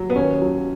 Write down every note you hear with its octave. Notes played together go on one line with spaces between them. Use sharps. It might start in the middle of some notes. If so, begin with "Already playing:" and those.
Already playing: F#3
B3
D#2 C#4
F#3